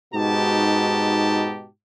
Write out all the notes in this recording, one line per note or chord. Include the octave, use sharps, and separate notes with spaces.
G#2 B2 D#4 F#4 G4 A5